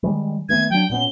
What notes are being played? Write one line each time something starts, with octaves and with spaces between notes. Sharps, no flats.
D#3 G3 G#3
D#3 A3 B3 G#6
F#3 D4 G5
A#2 B3 C#4 G7